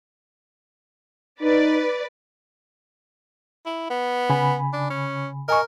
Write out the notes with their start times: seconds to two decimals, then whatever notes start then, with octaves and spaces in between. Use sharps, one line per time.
1.42 D#4 B4 D5
3.66 E4
3.90 B3
4.30 C#3 G#5 B5
4.73 D4
4.90 C#4
5.49 A#4 D#5 G#5 C#6